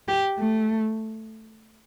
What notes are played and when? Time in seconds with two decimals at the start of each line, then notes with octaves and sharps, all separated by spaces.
0.08 G4
0.39 A3